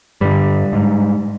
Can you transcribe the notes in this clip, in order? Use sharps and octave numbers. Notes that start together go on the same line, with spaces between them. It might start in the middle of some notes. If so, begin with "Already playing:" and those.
G2 D3 G3
G#2